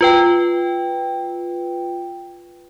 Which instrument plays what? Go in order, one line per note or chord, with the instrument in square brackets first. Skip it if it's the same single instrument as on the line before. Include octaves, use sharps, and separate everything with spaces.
[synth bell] F4 B4 G5